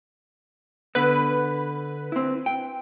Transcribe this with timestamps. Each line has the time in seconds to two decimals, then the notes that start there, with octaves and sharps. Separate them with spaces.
0.95 D3 B3 B4
2.12 C4 E4
2.46 G5